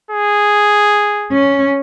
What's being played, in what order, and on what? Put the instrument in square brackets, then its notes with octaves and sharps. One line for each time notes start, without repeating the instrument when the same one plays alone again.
[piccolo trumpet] G#4
[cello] C#4